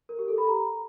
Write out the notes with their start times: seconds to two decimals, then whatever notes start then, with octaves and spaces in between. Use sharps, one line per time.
0.09 A#4
0.19 G4
0.28 A4
0.38 B5
0.48 A#5